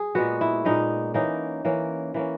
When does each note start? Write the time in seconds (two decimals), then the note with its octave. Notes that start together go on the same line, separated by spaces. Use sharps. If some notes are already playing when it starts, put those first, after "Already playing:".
Already playing: G#4
0.15 A#2 G#3 B3 F#4
0.41 E4
0.65 A#2 G#3 B3 D#4
1.14 E3 A#3 C#4 D#4
1.65 E3 A#3 C#4
2.14 E3 A#3 C#4